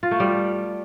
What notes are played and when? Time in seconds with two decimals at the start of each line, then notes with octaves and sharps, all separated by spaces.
0.03 F4
0.11 A3
0.20 G3